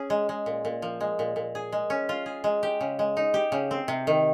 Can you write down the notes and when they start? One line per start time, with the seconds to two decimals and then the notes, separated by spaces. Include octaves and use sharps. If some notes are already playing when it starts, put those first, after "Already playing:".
Already playing: C#4 G#4
0.10 G#3
0.29 G#3
0.46 A#2
0.65 A#2
0.82 F3
1.01 G#3
1.19 A#2
1.36 A#2
1.55 G#4
1.72 G#3
1.90 C#4
2.09 F4
2.26 G#4
2.44 G#3
2.63 G4
2.81 C#3
2.99 G#3
3.17 D#4
3.34 G4
3.52 C#3
3.71 C4
3.88 C3
4.07 D#3